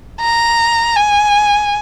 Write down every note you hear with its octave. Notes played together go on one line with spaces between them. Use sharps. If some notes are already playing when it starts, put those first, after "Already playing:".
A#5
G#5